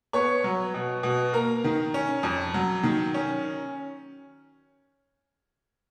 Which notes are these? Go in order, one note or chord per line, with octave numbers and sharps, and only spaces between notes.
B3 C#5 C#6
F#3
B2
B2
A#3 A#4 A#5
D#3
C#4
F2
F#3
D#3
C#4